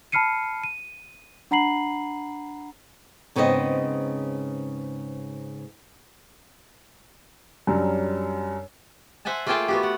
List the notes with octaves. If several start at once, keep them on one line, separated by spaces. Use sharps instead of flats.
A5 B5 F6 C7 C#7 D#7
D#7
D4 F#5 A#5 B5 C7 F#7
G#2 C#3 B3 C4 F#4 D#5
F#2 F#3 G3 D4
C5 E5 F#5 G#5 A5
A3 A#3 F4 G#4 G5 A5
B3 F#4 G4
F#5